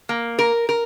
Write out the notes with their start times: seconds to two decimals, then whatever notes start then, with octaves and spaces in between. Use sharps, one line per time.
0.09 A#3
0.39 A#4
0.69 A#4